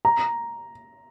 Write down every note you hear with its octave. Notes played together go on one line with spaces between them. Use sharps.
A#5